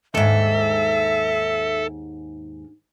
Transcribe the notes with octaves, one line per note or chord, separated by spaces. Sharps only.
D#2 G#2 A4 E5